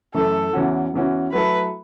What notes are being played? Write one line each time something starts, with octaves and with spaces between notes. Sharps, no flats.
F#2 E3 A3 A4
E2 E3 C#4 F#4
E2 E3 C#4 F#4
F#3 A3 E4 A4 B4